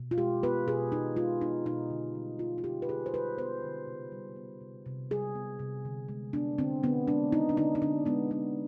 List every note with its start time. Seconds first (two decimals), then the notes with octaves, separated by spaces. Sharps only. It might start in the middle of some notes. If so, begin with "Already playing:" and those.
Already playing: B2
0.11 F4
0.18 G#3 G4
0.43 B3 B4
0.67 B2 G#4
0.92 B2 D#4
1.16 G#3 F4
1.41 B3 D#4
1.66 B2 D#4
1.90 D3
2.15 G3
2.39 B3 F4
2.58 F4
2.64 D3 G4
2.82 B4
2.89 D3 G#4
3.06 C5
3.14 G3 B4
3.38 B3 C5
3.63 D3
3.87 C3
4.12 G3
4.36 B3
4.61 C3
4.86 C3
5.11 G3 G#4
5.35 B3
5.59 C3
5.85 D3
6.08 G#3
6.33 B3 D4
6.58 D3 C4
6.83 D3 B3
7.08 G#3 D4
7.32 B3 D#4
7.49 D4
7.57 D3 D#4
7.75 D#4
7.82 D3 D4
8.06 G#3 B3
8.31 B3